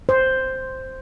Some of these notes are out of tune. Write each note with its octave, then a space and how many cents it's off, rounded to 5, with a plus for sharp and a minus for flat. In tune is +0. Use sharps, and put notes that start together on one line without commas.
C5 +0